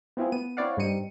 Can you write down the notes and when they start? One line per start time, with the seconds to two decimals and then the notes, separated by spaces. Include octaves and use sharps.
0.17 B3 C4 E4 F4 G#4
0.32 B3 D#7
0.57 C4 E4 C#5 D5 F5 F#5
0.77 G2 G3 C4 D#4 C#7 D#7